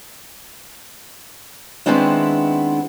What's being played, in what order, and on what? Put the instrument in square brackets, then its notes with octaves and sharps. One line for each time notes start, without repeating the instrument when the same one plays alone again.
[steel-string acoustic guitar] D#3 G#3 B3 C4 D4 E4